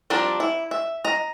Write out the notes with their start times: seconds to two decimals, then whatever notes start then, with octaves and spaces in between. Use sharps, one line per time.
0.10 F3 G3 C4 D4 A#4
0.40 E4
0.71 E5
1.05 D#5 A#5